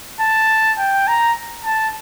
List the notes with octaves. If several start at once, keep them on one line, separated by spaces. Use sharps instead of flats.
A5
G5
A#5
A5